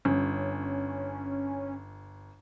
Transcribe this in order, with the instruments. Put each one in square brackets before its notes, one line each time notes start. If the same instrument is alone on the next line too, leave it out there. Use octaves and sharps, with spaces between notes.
[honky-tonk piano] G1 [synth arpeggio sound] C#4